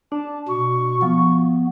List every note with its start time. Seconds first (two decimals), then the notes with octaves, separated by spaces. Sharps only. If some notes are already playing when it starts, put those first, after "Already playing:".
0.12 D4 A5
0.49 B2 C#6
1.02 F3 B3